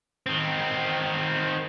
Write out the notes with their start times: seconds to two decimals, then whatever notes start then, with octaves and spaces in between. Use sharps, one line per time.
0.26 D#3 C4